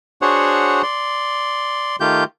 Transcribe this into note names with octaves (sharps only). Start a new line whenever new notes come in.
D4 F#4 G#4 C5 C#5 F#5
D5 C6
D#3 A3 F4 G4 G6